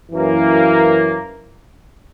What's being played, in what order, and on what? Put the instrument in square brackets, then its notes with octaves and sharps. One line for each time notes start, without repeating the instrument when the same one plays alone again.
[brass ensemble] F#2 E3 A#3